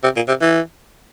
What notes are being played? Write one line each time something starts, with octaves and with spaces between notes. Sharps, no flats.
C3
A#2
C3
E3